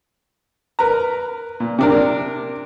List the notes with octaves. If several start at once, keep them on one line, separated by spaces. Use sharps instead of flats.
A#4 B4 A#5
A#2
C3 D4 A#4